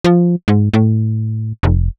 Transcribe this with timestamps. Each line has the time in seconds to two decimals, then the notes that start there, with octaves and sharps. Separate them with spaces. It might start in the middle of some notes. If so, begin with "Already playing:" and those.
0.04 F3
0.48 G#2
0.74 A2
1.63 F1